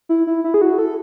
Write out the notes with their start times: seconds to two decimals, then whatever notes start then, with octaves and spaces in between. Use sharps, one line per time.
0.09 E4
0.27 E4
0.44 E4
0.54 G#4
0.62 F#4
0.78 A4